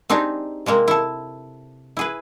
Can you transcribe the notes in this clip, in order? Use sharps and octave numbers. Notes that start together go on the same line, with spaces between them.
C4 D4 D#4 G4 G#4
C3 G#3 A#3 C4
E4 A4
E4 G#4 B4